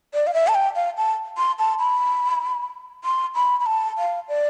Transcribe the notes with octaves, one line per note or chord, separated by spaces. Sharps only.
D5
F5
E5
A5
G5
F5
A5
C6
A5
B5
C6
B5
B5
A5
F5
D5